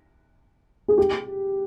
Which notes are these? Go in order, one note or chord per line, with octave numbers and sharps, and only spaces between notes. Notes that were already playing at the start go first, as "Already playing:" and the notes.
G#4
G4